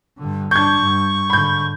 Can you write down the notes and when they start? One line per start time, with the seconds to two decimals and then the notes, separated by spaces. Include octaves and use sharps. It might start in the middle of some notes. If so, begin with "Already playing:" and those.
0.18 G2 D3
0.51 G2 D4 C#6 G6 G#6
0.79 G2
1.30 G#2 D3 B5 G6